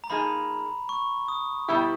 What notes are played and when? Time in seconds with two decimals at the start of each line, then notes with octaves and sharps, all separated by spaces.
0.04 A#5
0.10 F3 A#3 D#4 G#4 B5
0.89 C#6
1.28 D#6
1.68 B2 G3 B3 E4 G4